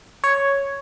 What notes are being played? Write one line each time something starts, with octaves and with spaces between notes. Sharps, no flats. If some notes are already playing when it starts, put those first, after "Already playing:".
C#5